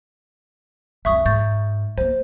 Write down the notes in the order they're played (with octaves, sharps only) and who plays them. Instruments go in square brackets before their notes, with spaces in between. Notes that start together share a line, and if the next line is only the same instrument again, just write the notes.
[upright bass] C2 F2 [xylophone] E5 C#6 D#6
[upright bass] G#2 [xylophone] C#6 G6 A6
[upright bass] A3 A#3 [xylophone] C5